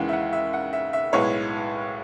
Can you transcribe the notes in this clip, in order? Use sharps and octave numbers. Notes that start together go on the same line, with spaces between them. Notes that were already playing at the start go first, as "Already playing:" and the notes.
Already playing: D#2 C#3 E3 G#3 F#5
E5
F#5
E5
F#5
E5
E5
B1 A2 G#3 B3 C#5